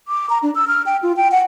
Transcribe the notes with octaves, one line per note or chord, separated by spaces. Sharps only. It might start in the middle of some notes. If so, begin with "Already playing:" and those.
D6
A#5
D4
E6
F6
G5
F4
G5
F#5